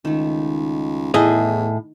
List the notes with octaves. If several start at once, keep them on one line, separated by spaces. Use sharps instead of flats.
C#2 D#3 A3
E2 A2 G#4 D#5